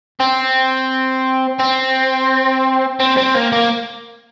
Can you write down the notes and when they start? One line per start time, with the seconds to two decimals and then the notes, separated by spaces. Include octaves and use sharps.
0.20 C4
1.60 C4
3.00 C4
3.17 C4
3.35 A#3
3.52 A#3